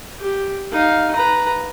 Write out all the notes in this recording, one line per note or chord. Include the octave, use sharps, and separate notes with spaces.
G4
D#4 F5
B4 A#5